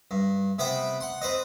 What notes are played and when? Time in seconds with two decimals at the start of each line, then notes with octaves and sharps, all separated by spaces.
0.11 G2
0.59 C3 B3 B4 C5 G5
1.01 F#5 C6
1.21 C4 B4 C5 D#5